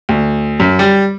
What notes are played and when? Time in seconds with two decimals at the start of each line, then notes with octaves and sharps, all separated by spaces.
0.09 D2
0.60 F#2
0.79 G3